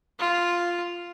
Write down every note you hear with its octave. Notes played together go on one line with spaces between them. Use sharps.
F4